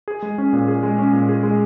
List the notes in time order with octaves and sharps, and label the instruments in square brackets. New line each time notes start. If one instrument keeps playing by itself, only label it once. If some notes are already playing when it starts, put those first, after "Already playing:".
[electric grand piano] G#4
G#3
C#4
A#2
G#4
G#3
C#4
A#2
G#4
G#3